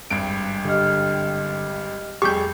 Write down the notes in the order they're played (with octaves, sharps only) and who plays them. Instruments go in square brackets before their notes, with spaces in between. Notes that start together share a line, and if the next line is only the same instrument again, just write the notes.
[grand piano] G#1 G2 D7
[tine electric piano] D3 [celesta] G4 D#5 F6
[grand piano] F1 G3 C#6 [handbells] G4 G6 [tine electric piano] G#4